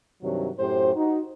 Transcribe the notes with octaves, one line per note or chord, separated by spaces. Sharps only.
G2 C3 D#3 F#3
F#2 A2 G4 C5
D#4 F#4